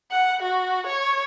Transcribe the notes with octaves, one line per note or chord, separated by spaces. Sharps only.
F#5
F#4
C#5